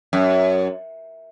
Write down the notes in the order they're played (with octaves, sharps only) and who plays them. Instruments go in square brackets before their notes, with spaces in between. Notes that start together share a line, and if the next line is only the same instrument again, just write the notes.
[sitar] F#2